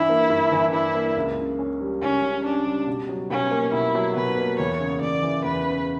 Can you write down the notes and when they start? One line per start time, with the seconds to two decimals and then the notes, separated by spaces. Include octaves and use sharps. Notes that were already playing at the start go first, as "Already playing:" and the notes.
Already playing: G2 E3 D4 E4
0.09 A#3
0.30 G2
0.52 E3
0.73 D4 E4
0.95 A#3
1.17 C#2
1.38 C#3
1.59 C#4
1.81 G3
2.02 C#2 C#4
2.23 C#3
2.45 C#4 D4
2.66 G3
2.87 B2
3.09 F#3
3.30 B2 C#4
3.51 A#3
3.73 B2 E4
3.95 F#3
4.16 B2 B4
4.37 A#3
4.59 E2 C#5
4.80 C#3
5.02 E2 D5
5.23 E3
5.44 E2 B4
5.66 C#3